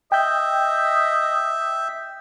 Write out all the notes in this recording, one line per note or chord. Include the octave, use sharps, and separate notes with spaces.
D#5 E5 G5 G6